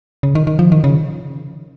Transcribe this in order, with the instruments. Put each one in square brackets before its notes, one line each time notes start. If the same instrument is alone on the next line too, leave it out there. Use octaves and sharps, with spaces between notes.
[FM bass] C#3
D#3
D#3
F3
D#3
C#3